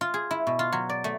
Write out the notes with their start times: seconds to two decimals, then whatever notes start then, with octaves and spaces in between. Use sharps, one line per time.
0.01 F4
0.14 G#4
0.31 E4
0.47 B2
0.59 F4
0.72 F#3
0.90 D5
1.04 A3